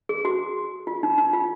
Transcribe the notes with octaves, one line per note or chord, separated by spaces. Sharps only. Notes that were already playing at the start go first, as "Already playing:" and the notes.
G#4
F#4
F4
D#4
D#4
F4